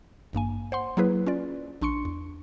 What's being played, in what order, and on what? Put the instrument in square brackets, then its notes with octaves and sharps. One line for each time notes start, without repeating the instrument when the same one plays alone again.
[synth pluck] G#1 G2 A#3 G#5
C5 F#5 C6
F#3 A#3 E4 G#4 B4
C#4 F4 D5
A#1 D4 C6 C#6 C#7
E2